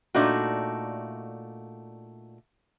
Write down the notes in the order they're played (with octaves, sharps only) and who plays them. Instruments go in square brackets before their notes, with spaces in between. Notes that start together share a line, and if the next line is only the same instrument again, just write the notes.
[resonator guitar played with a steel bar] A#2 A3 D4 D#4 F#4